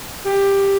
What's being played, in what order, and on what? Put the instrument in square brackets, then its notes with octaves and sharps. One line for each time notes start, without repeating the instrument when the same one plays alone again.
[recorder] G4